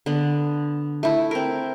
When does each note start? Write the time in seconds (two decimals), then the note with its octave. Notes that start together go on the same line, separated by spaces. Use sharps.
0.06 D3 B3
1.03 A3 E4
1.31 C4 A#4